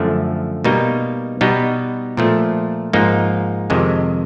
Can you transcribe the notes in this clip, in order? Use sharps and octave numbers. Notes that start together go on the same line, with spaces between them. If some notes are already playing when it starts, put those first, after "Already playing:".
Already playing: F#2 D3 F3 A3
B2 G3 A#3 D#4
B2 G3 B3 D#4
A#2 F3 A3
G#2 F3 A#3 D#4
F2 C3 D#3 G#3